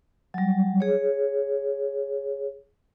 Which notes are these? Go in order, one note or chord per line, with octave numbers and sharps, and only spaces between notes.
F#3 G3
G#4 C#5